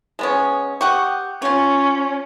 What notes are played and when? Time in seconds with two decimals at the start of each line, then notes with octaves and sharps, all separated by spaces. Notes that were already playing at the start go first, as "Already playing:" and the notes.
0.19 G#3 B3 C#4
0.81 G4 F#5 C#6 D#6
1.42 C#4 F4 C#5